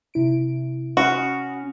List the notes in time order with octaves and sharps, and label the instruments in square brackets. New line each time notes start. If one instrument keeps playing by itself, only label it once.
[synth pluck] C3 E4 D7
[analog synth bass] C#4 [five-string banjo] F#4 [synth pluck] B5 D#6 F6